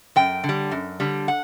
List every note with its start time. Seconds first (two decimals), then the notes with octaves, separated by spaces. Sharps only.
0.16 F#2 G5
0.44 D3
0.49 G3
0.71 F#2
1.00 D3 G3
1.28 F#5